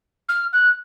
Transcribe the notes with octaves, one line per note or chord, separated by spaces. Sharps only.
F6
F#6